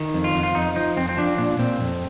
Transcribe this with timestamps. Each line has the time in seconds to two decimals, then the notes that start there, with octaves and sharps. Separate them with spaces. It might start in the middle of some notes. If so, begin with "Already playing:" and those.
Already playing: D#3
0.14 F2
0.24 F4
0.35 F2
0.43 F4
0.55 F2 D#4
0.76 F3 D#4
0.97 F2 C4
1.09 C4
1.17 F3 D4
1.38 A#2 D4
1.59 A#2 C4
1.81 F2